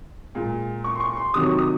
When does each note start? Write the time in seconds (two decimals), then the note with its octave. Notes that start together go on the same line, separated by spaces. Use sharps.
0.35 A#2 G#3
0.84 C#6
0.95 C6
1.00 C#6
1.17 C6
1.34 C3 D#3 F#3 D#6
1.46 C#6
1.58 D#6